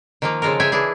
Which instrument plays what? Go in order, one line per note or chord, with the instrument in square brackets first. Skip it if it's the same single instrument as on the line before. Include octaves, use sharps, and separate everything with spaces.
[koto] D#3 F3 A#3
C#3 F3 G#3 A4 A#4
G#4 C#5 E5 G5 G#5
E3 D4 E4 G#4